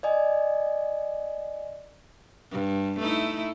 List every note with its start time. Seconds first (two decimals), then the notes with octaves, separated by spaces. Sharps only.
0.03 D5 D#5 G#5
2.52 G2
2.99 A3 D#4 E4